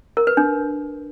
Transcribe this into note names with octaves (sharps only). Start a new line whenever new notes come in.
A#4
B4
D4